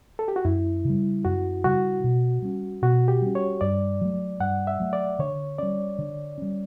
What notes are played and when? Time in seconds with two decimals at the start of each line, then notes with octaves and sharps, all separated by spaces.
0.19 A4
0.28 G4
0.36 F#4
0.45 F#2 E4
0.85 C#3 G3
1.25 F#2 F#4
1.64 C#3 G3 F#4
2.04 B2
2.42 G3 C#4
2.82 B2 F#4
3.08 G4
3.22 G3 C#4
3.35 C#5
3.61 G2 D5
4.01 F#3 A3
4.40 G2 F#5
4.67 E5
4.80 F#3 A3
4.93 D5
5.19 D3 C#5
5.58 G3 C#4 D5
5.98 D3
6.38 G3 C#4